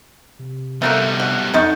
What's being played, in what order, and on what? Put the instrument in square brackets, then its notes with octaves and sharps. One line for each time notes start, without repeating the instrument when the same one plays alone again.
[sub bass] C3
[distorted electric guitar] B2 G3 [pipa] A3 A#3 F#4
[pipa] F#4
[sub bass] F2 [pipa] D3 D#4 C#6